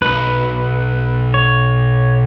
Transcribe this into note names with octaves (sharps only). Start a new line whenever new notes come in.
B1 B4
C#5